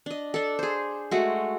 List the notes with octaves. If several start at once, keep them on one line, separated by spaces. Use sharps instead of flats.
D4 D#5
D4 A4
G#4 C5
G#3 A3 F#4